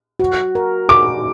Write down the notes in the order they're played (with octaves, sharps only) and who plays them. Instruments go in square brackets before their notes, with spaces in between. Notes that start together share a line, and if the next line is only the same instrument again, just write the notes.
[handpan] F#4
A#4
[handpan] F#4 [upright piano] D6